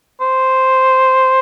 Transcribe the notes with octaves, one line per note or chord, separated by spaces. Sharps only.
C5